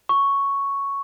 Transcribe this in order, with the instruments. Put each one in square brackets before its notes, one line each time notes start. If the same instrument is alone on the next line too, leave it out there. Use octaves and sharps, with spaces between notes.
[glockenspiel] C#6